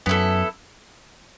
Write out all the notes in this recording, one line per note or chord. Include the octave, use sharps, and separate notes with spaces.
F#2 B3 E4 A4